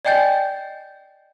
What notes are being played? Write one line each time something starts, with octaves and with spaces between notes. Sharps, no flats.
D5 D#5 G5 G#5 G6 A6